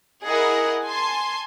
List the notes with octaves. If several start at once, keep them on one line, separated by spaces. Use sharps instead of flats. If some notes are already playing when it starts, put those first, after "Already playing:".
E4 G#4 A#4 D#5 F#5
G#5 A5 C6